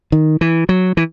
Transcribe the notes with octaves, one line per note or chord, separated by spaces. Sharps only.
D#3
E3
F#3
E3